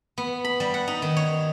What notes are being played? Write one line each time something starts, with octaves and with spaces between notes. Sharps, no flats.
B3
B5
G3
F#5
D#4
D#3
C#5